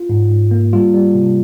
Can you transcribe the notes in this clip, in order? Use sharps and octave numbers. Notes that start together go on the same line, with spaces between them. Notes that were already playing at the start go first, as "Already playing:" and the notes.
Already playing: F4
G#2
G#2
A#3
G3 F4
G3
C3